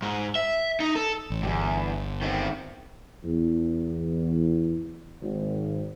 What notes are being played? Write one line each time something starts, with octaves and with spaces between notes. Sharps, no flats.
G#2
E5
D#4
A4
A1
G1 E2 G2
D#3 C4
E2
G#1